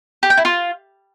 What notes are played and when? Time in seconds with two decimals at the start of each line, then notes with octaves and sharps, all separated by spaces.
0.23 G4
0.30 G5
0.37 E4
0.45 F4